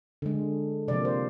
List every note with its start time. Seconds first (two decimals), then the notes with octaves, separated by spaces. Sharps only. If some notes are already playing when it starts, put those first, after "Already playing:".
0.22 D3 G#3
0.88 C3 D5
0.91 F3 A#3
1.05 C5